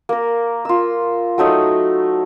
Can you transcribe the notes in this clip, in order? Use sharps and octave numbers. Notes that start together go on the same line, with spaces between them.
A#3 A#4
F4 E6
F#3 A3 D#4 C#5